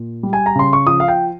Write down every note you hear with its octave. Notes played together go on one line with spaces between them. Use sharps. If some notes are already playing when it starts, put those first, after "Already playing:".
Already playing: A#2
G3
G#5
A#5
C#3 C6
C#6
F3 D#6
F5
G5